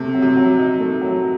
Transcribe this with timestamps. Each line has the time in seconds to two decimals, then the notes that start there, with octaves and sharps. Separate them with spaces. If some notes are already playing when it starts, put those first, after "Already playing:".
Already playing: C3 A3
0.15 F#3
0.22 C3
0.37 F#3
0.59 D#4
0.80 A3
1.01 F#3